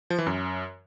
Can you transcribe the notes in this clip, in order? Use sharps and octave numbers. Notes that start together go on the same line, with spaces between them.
F3
E3
F#2